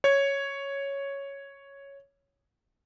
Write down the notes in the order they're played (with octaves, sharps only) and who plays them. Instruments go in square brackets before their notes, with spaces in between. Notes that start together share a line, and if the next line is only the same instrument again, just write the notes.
[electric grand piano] C#5 G#6